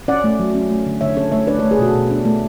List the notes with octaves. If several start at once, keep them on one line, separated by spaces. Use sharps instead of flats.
C#4 D5 F#5
A3
F#3
C#4
A3
D3
D3 C#5 E5
C#4 A4 C#5
A3 C#5 E5
D4 B4 D5
A3 A4 C#5
G#4 B4
B2 F#4 A4
B2
D4
A3